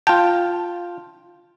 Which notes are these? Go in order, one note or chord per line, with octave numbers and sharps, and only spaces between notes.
F4 G5 A5